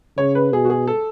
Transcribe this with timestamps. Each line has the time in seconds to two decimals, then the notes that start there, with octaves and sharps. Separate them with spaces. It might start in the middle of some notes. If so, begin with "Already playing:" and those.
0.17 C#3 C#5
0.35 B4
0.52 B2 G#4
0.65 F#4
0.70 G#4
0.87 A4